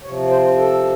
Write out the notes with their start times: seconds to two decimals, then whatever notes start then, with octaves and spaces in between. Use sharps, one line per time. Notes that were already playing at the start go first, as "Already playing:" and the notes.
0.03 C3 F3 C#5
0.30 C5
0.56 A4